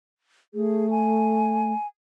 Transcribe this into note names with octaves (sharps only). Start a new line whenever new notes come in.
A3 G#4
G#5